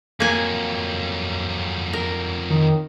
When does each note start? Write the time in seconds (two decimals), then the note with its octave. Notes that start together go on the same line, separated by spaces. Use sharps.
0.20 F2 F#3 A#3 F#5 G#5
1.93 A#4
2.50 D#3